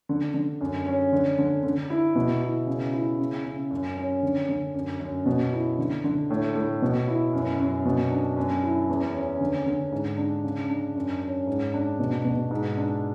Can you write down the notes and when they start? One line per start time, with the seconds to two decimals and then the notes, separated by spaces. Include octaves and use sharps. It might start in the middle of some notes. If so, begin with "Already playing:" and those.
0.09 D3
0.34 D3
0.61 F#2
0.86 C#4
1.12 D3
1.38 D3
1.63 D3
1.90 E4
2.15 B2
2.42 E4
2.67 C#3
2.93 E4
3.19 C#3
3.45 C#3
3.71 F#2
3.97 C#4
4.23 D3
4.49 D3
4.75 F#2
5.00 F#2
5.26 B2
5.53 E4
5.78 D3
6.04 D3
6.30 A2
6.55 A2
6.82 B2
7.08 E4
7.33 F#2
7.59 F#2
7.85 B2
8.10 D4
8.36 F#2
8.63 E4
8.89 E2
9.15 C#4
9.40 D3
9.66 D3
9.92 G#2
10.18 D4
10.44 C#3
10.70 D4
10.95 F#2
11.22 C#4
11.47 G#2
11.74 D4
11.99 B2
12.25 B2
12.51 G#2
12.77 D4